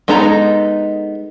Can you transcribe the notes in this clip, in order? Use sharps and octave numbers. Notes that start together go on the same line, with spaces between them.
G#3 B3 D#4 A4 A#5